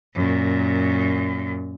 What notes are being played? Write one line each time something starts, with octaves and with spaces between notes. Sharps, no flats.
F#2 A#2